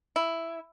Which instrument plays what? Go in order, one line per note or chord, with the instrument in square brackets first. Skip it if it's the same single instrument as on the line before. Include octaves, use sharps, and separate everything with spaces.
[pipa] E4